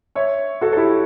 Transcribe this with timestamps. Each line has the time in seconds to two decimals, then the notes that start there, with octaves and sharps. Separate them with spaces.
0.15 C#5 E5
0.61 F#4 A4
0.73 A4
0.77 E4 G4